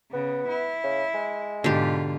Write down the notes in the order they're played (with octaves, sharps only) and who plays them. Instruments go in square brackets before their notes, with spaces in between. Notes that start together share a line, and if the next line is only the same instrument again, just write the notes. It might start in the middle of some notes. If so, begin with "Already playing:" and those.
[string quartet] C#3 [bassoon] B3
[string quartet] E4
[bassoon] C#3
G#3
[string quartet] G#2 B2 F4 [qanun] D3 G4